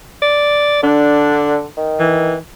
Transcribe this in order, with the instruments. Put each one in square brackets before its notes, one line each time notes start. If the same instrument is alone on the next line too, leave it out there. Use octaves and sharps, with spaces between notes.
[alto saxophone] D5
[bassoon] D3 [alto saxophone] D4
[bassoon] D#3
[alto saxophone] E3